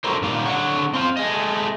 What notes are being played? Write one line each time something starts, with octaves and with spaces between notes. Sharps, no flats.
F#3 D4 F#4 A4 A#4 C5
A#2 G3 D#4 G4 F5
D3 C#5 F#5
C4 C5 F5
A3 G#4 D#5